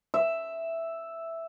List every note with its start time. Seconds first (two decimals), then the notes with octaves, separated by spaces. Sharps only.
0.14 E5